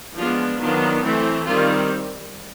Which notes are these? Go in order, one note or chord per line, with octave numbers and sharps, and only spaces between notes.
F3 G#3 B3 D4 F4
D#3 F#3 B3 D4 F4
E3 A3 C4
D#3 G3 C4 F4